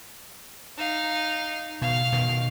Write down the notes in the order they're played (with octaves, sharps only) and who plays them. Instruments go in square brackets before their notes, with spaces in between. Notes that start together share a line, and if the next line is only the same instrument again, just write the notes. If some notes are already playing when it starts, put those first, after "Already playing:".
[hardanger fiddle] D#4 F5
[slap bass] B2 [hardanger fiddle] F5
[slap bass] B2 D#3